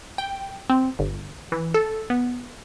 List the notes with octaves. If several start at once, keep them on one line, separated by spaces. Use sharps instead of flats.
G5
C4
G1
E3
A4
B3